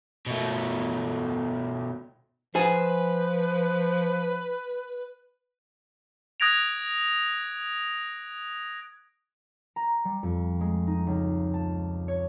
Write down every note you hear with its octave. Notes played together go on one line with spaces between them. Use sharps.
B2 A3
F3 G#4 B4 C5 G#5
D#6 F#6 G#6 A#6 D7 F7
A#5
G3
F2
G#3
D#4
C#2
A5
C#5